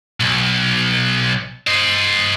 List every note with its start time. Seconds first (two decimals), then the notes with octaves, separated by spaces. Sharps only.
0.20 B1
1.67 C5 D#5